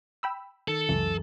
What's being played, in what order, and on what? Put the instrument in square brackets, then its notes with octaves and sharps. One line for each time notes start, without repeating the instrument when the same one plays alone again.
[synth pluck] G5 B5 E6
[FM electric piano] D#3 C#7 [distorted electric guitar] A4
[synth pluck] C#2 [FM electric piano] F#2 [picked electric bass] E3